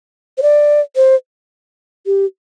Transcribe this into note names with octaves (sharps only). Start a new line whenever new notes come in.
C5
D5
C5
G4